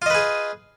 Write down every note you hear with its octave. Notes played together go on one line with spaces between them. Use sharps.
F4 G#4 B4 D#5